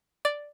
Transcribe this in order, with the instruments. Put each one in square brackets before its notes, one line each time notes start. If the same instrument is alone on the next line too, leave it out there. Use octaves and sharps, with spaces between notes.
[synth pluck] D5